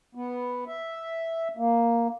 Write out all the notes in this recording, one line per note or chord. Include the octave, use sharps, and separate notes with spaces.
B3
E5
A#3